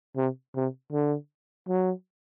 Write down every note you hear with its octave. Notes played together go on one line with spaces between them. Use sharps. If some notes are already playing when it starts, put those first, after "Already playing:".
C3
C3
D3
F#3